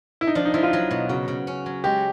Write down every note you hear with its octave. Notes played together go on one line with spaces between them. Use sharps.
E4
D#4
F3 D4
D#4
F3 E4
F4
F#3
B2
C#3 F#4
C#3
C#4
F#3
G#3 G4